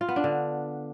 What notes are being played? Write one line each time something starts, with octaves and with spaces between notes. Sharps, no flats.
F4
B3
D4
D3